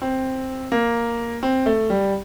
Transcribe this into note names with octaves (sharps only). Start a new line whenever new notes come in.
C4
A#3
C4
A3
G3